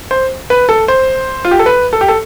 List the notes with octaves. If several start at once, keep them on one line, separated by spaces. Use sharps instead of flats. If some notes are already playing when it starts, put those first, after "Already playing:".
C5
B4
A4
C5
F4
G4
A4
B4
A4
G4
A4